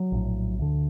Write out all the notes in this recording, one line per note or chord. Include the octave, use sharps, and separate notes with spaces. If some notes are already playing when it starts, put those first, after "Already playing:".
Already playing: F#3
A#1 A2
D2 D3